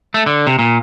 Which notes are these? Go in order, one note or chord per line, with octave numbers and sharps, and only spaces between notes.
A3
D3
C3
A#2